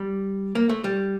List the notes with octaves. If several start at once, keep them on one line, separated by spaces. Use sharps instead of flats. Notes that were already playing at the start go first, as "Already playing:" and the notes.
Already playing: G3
A#3
A3
G3